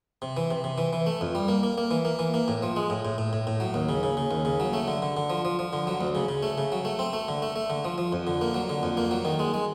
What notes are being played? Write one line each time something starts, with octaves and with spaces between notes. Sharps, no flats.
C3
E3
C3
C3
E3
E3
A3
F2
G3
A#3
A#3
A#3
E3
A#3
E3
A#3
A2
F3
G#3
A2
A2
A2
A2
A2
F#3
D#2
C#3
C#3
C#3
D#2
C#3
F#3
A3
D3
D3
D3
F3
F3
F3
D3
F#3
D2
C#3
C#3
A3
C#3
F#3
A3
C4
A3
D3
A3
A3
D3
F3
F3
F2
D3
A#3
F#3
D3
F2
A#3
F#3
D#3
G#3
G#3